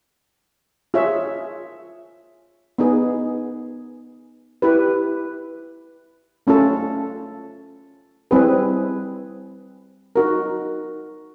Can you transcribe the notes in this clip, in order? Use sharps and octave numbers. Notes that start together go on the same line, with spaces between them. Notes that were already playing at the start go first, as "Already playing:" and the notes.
F4 G#4 C#5 E5
B3 D#4 G#4
E4 G4 B4
A3 C#4 F4 A4
G3 C4 E4 G#4 B4
D#4 F#4 A#4